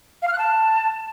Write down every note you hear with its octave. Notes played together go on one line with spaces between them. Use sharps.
F5
F6
F#6
A5